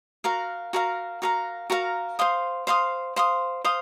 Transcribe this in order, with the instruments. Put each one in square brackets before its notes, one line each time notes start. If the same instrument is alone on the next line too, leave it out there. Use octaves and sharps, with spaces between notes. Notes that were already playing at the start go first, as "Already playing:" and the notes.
[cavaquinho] F#4 A#4 F5 A#5
F#4 A#4 F5 A#5
F#4 A#4 F5 A#5
F#4 A#4 F5 A#5
C5 F5 C6 D#6
C5 F5 C6 D#6
C5 F5 C6 D#6
C5 F5 C6 D#6